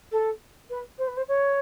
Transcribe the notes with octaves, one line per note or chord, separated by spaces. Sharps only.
A4
B4
C5
B4
C5
C#5